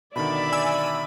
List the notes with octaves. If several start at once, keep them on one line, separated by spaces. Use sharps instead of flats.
B2 D3 D#3 D5 E5 B5
G#5 E6